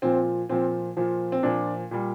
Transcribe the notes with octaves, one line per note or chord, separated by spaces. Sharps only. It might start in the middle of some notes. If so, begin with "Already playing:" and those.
A#2 F3 C4
A#2 F3 C4
A#2 F3
C4
A#2 F3 D4
A#2 G3